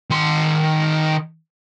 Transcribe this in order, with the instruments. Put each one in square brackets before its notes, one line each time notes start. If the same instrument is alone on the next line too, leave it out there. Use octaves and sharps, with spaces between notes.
[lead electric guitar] D#3 C6